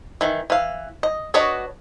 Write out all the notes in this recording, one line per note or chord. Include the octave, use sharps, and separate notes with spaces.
D#3 E3
E3 F5
D#5
D4 F#4 B4 C#5 D#5